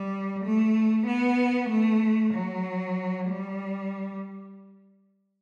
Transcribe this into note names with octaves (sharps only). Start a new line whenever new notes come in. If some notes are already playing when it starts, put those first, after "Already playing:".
Already playing: G3
A3
B3
A3
F#3
G3